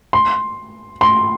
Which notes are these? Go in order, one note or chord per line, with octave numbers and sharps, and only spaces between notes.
C6
C6